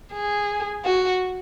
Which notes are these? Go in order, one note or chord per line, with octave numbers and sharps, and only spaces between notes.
G#4
F#4